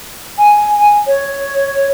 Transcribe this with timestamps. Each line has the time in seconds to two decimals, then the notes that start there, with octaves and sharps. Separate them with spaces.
0.39 G#5
1.07 C#5